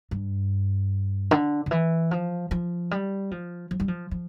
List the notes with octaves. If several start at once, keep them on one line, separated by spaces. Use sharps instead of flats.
G2
D3
D3
E3
F3
F3
G3
F3
F3
G3
F3
F3